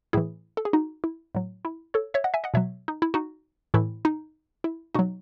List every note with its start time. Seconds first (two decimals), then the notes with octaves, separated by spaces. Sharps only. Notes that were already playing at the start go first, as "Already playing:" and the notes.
0.13 A2 E3 E4 G#4
0.57 A4
0.65 G#4
0.73 D#4 F#4
1.04 E4
1.35 A2 F#3
1.65 E4
1.94 A4 C#5
2.14 C#5 E5
2.24 D#5 F#5
2.34 E5 G#5
2.44 D#5 F#5
2.54 B2 F#3 C#5 E5
2.88 D#4
3.02 E4
3.14 D#4 F#4
3.74 A2 E3 E4
4.05 D#4
4.64 E4
4.95 B2 F#3 D#4 F#4